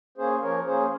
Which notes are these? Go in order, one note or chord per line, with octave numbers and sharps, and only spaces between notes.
A#3 C#4 G#4 C5
F3 A#4 C#5
A#3 C#4 G#4 C5